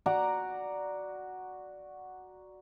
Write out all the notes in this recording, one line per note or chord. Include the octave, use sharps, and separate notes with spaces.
F#4 D5 F#5 A#5